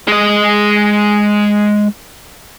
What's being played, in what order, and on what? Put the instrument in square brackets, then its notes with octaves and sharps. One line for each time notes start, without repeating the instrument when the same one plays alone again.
[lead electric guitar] G#3 D#5